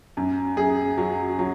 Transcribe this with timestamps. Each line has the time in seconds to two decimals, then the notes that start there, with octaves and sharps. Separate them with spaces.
0.17 F#2
0.57 F#2 G#4
0.98 F#3
1.39 F#3